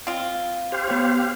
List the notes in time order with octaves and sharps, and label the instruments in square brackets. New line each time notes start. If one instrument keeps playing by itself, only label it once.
[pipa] C4 F4
[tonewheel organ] G4 C5 F5
[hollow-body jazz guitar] B3 C#5
[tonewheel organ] G4 F5